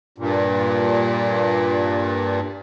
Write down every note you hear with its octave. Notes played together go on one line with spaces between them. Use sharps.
G2 A#2